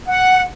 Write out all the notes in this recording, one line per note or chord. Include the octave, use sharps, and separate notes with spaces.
F#5